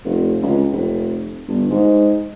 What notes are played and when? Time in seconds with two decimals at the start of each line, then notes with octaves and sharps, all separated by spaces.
0.05 F1
0.43 C#2
0.72 F1
1.48 G1
1.70 G#2